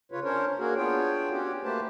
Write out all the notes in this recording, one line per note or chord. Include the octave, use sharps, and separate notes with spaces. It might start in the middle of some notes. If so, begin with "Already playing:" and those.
C#3 F4 B4 C#5
C#4 D4 A#4 C5 C#5
A#3 F#4 G#4 A#4
B3 D4 F4 G#4 C#5 G5
C#4 F#4 G4
A3 A#3 G4 B4 C5 A5